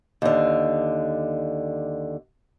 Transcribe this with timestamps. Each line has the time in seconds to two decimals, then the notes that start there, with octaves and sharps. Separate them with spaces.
0.22 D#2 D3